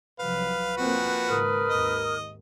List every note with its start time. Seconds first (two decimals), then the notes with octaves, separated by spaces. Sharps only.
0.20 C2 F3 F#3 B4 F5
0.77 F3 A#3 C4 F#4
1.28 G#1 G#2 C#3 A#4 D#6 F6
1.68 G#1 D#2 D#5